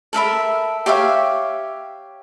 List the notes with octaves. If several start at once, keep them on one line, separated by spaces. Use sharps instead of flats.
A4 A#4 E5 B5
G4 C#5 E5 F5